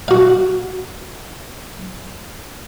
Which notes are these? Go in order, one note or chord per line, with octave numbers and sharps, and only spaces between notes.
F#4 F5